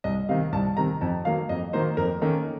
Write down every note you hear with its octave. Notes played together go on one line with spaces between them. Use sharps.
C2 D#5
C3 D#3 F5
C2 A5
C3 D#3 A#5
F2 A5
D#3 F#3 A#3 D#4 F5
F2 D#5
D#3 F#3 A#3 D#4 C5
F2 A#4
D#3 A#3 C#4 A4